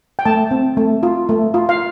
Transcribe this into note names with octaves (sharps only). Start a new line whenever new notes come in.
G5
A3 A5
C4
A3
F4
A3
F4
F5